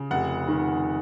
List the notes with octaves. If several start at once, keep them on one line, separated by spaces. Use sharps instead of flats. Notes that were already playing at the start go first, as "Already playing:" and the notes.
Already playing: C#3
F1 F#5
D#3